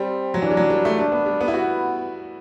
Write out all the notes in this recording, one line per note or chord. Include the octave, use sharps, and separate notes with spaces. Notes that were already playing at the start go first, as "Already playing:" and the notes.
Already playing: G3 C4
F#3
E3 D4
G3
F#3
G3
A3
A3 D4
B3
G3
B3
E4
B3 F#4